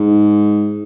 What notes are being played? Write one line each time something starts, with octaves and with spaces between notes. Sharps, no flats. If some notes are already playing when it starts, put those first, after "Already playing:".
Already playing: G#2